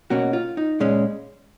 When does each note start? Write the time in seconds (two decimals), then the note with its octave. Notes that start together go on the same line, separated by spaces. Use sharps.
0.10 B2 A#3 C#4 F#4
0.33 F4
0.57 D#4
0.80 A#2 G#3 C#4